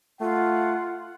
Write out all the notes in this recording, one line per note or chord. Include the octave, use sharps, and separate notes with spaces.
A3 F4 F#5